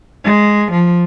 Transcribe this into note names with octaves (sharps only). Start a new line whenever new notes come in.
G#3
F3